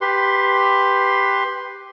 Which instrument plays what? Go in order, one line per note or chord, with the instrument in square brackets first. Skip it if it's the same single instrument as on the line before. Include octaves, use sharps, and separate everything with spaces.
[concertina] G4 B4 C6